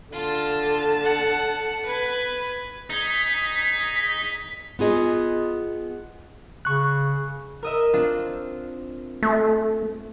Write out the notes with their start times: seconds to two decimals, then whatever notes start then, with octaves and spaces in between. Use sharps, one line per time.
0.13 D3 F4 A5
1.04 F#5
1.86 B4 G#6
2.90 D#4 G#4 B6
4.79 B3 F4 G#4 D#5
6.65 C#3 C#6 F#6
7.63 A#4 D#5 E5
7.94 C4 D4 F4
9.22 A3